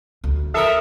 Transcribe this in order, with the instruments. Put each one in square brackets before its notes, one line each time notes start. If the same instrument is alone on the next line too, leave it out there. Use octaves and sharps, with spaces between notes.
[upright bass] D2
[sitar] A4 A#4 [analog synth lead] E5 [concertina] D#6